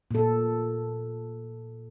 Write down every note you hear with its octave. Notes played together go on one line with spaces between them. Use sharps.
A#2 A4